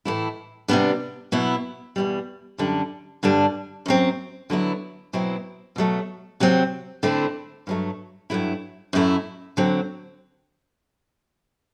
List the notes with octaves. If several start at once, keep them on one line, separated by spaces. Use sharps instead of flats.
A2 E3 A3 E4
C3 G3 B3 D4
B2 F#3 B3 E4
E2 B2 G3
F#2 D3 G3 D4
G2 D3 G3 D4
F#2 F#3 C4
D3 F#3 B3 E4
B2 F#3 C4 E4
B2 F#3 A3
C3 F#3 C4
D3 A3 C4 E4
G2 F#3 A3
G2 F#3 A3 E4
F#2 F#3 A3 E4
D3 F#3 C4